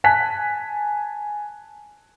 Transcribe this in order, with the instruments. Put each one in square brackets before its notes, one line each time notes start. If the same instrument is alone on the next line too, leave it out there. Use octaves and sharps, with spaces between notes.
[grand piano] G#5 A5 F#6 B6